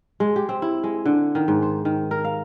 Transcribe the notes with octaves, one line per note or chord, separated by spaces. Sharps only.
G#3
G4
C4
E4
G#3
D3
D#3
G#2
C5
D#3
A#4
F5